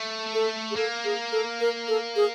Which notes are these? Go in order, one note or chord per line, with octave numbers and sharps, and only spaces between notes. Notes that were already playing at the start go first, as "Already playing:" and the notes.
Already playing: A3
A4
G#4
A#3 A4
G#4
A4
A#4
A4
G#4